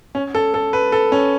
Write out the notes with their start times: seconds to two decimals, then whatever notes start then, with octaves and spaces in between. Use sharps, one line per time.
0.15 C#4
0.35 A4
0.54 A4
0.73 B4
0.92 A4
1.12 C#4